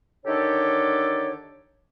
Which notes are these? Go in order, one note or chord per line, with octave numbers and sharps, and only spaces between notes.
D3 D#3 D4 G4 A4 C#5